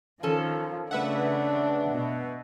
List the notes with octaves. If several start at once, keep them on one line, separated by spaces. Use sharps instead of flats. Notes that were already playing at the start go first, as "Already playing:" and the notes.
D#3 F3 C#4 A4
C#3 A3 D4 B4 E5 F#5
B2